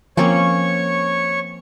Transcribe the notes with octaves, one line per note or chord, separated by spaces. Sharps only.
F3 A#3 C4 C#4 C#5 C#6